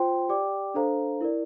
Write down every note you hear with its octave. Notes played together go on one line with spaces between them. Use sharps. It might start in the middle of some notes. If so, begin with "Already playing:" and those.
Already playing: F4 C5 G5 C6
G4 D5 G5 D6
D4 A4 C5 F5 A#5
E4 A#4 D5